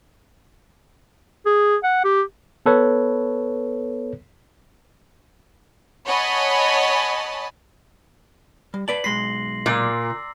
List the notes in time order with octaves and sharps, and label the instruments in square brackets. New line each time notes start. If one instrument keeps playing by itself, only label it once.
[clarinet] G#4
F#5
G4
[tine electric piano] B3 A4 B4 C#5
[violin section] C#5 D#5 F#5 G#5 A5 B5
[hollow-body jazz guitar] G3
[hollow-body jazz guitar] B4 D5 A5 [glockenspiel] F#7
[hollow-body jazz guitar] B1 G#3 B5 [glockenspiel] C6 A#6 C7
[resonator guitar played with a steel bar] A#2 [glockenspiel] D6 E6